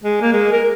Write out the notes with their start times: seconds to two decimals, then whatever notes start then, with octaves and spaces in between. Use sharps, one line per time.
0.04 G#3
0.22 A#3
0.33 G#3
0.53 A#4